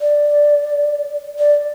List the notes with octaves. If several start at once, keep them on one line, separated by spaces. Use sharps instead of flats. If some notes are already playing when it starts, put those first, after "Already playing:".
D5
D5